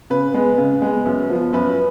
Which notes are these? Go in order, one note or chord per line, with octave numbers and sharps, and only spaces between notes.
C#3 B4
G#3 B3
C#3
G#3 B3
F#2
F3 B3
F#2 B4